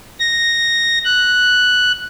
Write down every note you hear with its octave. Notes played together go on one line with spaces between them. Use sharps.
A#6
F#6